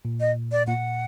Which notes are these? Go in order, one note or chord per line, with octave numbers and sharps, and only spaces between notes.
A#2
D#5
D5
A#2 F#5